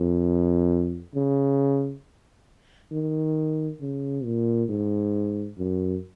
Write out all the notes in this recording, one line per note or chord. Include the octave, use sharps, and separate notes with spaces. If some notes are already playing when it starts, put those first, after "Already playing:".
Already playing: F2
C#3
D#3
C#3
A#2
G#2
F#2